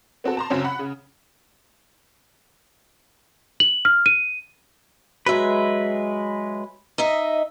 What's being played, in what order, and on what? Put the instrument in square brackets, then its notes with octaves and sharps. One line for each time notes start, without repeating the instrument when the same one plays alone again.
[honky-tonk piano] B3 C4 F#4 A4
A5 A#5 C6
C#2 F#2 C4 C#4
F#5 B5
C#3
[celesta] F#7
F6
D#7
[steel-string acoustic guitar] F#3 E5 [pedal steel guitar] G#3 B4
[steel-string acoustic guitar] D#4 D#5 E5